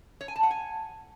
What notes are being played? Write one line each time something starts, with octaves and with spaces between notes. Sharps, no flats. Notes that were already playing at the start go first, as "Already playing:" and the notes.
C#5
G#5
A5
F#5
G#5